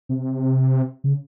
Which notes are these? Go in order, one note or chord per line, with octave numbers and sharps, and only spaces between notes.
C3
C#3